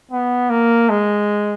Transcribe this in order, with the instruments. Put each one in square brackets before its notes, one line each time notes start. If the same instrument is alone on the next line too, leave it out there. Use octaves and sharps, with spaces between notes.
[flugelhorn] B3
A#3
G#3